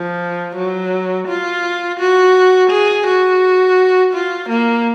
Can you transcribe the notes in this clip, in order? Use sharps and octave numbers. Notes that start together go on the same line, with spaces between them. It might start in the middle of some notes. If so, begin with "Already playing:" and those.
Already playing: F3
F#3
F4
F#4
G#4
F#4
F4
A#3